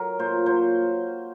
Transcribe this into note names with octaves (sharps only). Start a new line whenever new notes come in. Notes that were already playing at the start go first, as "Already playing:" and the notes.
Already playing: F#3 A#4
A#2 C5
F#3 C5